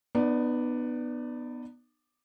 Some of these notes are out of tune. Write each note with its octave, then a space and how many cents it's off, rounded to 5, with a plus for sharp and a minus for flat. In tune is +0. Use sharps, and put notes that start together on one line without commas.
B3 +0 D#4 -35 D5 +0